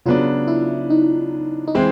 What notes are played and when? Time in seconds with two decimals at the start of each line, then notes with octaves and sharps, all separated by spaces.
0.06 C#3 F#3 B3 D4 F4
0.48 E4
0.90 D#4
1.68 D#4
1.75 E3 G#3 C4 E4